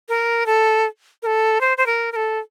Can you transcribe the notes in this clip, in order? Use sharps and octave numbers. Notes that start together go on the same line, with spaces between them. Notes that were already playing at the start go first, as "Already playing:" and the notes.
A#4
A4
A#4
A4
C5
C5
A#4
A#4
A4